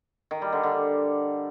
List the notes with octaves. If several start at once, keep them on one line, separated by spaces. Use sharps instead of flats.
D#3
G3
D3
D3